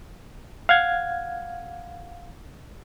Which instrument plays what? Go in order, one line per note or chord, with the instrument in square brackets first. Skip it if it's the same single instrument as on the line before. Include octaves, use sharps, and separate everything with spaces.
[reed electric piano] F5 F#5 G#6